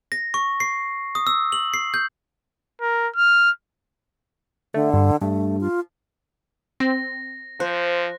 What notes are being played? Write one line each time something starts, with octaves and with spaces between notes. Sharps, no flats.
A#6
C#6
C7
D#6
E6
F#7
C7
G6
A#4
F6
D3 A3
G2
G2 A3
F4
C4 A#6
F3 C5 F#6